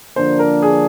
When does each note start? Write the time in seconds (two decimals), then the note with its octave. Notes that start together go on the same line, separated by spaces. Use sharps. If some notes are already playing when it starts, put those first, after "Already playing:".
0.16 D3 F3 A#3 D4 C5
0.39 A#4
0.63 G#4